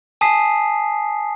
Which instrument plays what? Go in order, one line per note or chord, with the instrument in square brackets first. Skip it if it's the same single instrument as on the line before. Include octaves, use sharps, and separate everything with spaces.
[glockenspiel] G#5 A5 D#6 B6 C7